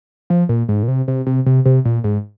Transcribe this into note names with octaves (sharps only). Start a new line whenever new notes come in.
F3
A#2
G#2
A#2
C3
C3
C3
C3
C3
A#2
G#2